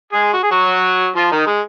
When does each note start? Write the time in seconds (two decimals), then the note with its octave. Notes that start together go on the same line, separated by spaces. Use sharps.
0.13 G#3 G#4
0.34 F#4
0.43 G#4
0.51 F#3 F#4
1.16 F3 F4
1.31 D#3 D#4
1.47 G#3